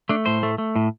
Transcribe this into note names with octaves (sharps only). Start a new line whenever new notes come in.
A3 D4
A2 C5
A3
A3
A2